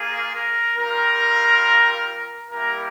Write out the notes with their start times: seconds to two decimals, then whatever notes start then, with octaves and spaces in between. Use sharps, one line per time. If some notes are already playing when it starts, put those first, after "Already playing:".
Already playing: A#3 F4 G#4
0.33 A#4
0.77 G3 C4 F4 A#4
2.50 G3 A#3 E4 G4 A#4